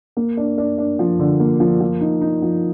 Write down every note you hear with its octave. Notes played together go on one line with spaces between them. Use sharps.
A#3
D4
D4
D4
F3
D3
A#3
F3
F3
D#4
D#4
F3